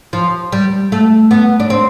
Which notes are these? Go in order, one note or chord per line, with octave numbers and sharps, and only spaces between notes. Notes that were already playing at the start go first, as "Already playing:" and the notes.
F3
G3
A3
B3
D4
C4